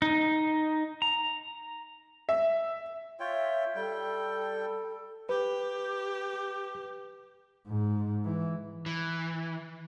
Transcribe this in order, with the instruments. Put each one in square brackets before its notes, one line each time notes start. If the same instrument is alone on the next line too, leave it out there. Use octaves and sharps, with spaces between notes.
[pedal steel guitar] D#4
A#5
[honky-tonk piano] E5
[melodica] F4 C#5 G5 [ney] E5
[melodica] G3 G5 [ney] A4
[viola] G4 [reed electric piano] B4
[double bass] G#2
E3
[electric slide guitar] E3